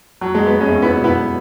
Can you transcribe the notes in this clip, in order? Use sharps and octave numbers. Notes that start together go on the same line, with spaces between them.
F#3
F#3 G#3
B3
G#3 C#4
E2
B3 E4
B2
B3 E4